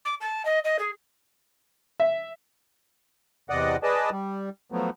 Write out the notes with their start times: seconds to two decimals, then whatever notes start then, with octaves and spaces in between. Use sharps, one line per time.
0.05 D6
0.21 A5
0.45 D#5
0.64 D#5
0.79 G#4
2.00 E5
3.50 E2 C3 D5 D#5 F#5
3.83 G#4 B4 D5 D#5 A5
4.11 G3
4.72 F3 F#3 A3 B3